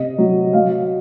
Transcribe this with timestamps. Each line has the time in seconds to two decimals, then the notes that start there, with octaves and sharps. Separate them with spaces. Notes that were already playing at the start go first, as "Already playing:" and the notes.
Already playing: C3 D#5
0.18 F#3
0.53 F#3 F5